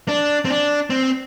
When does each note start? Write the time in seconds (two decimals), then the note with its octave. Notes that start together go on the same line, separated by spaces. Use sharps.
0.08 D4
0.45 C4
0.50 D4
0.90 C4